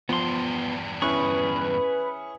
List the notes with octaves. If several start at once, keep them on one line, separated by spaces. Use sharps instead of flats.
E2 G2 F3 B3 C6
C#4 E4 G#4 B4 C#6